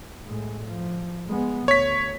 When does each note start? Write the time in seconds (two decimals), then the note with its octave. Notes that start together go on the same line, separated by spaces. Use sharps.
0.25 A2 G#3
0.66 F3
1.27 G#3 B3
1.68 D2 C#5 B6